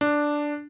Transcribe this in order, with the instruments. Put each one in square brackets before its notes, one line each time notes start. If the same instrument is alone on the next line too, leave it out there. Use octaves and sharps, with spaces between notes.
[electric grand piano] D4